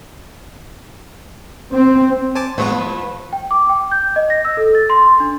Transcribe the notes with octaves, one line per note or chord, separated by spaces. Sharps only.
C4
C5 G#5 A5 D6
A2 E3 F3 G#3 B3 B4
G5
D6
G5
G6
D#5
A#6
E6
A4
A6
C6
D4